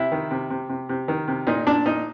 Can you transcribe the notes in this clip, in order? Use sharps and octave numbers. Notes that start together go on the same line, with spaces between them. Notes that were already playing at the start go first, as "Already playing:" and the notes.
Already playing: C3 E4
D#3
C3
C3
C3
C3
D#3
C3
A#2 D#4
A#2 D4
A#2 D#4